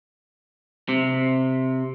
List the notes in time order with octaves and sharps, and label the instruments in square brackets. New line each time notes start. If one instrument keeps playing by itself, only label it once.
[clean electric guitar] C3